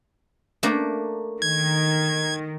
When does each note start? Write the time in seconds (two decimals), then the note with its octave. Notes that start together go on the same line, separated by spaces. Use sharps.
0.63 A3 A#3 D4
1.42 D#3 G#6